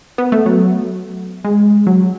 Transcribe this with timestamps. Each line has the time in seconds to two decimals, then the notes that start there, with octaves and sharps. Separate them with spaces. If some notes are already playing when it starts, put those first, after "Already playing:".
0.18 B3
0.32 A3
0.46 F#3
1.45 G#3
1.87 F#3